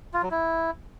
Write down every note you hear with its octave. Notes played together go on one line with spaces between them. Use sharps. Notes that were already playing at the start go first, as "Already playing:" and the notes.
F4
F#3
E4